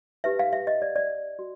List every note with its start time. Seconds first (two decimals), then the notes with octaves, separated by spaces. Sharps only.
0.24 D#4 G4 B4 E5
0.39 F5
0.53 E5
0.67 D#5
0.82 D5
0.96 D5
1.39 F#4